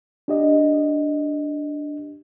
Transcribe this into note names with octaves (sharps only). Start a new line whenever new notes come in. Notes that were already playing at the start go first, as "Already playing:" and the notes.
D4 G4 D#5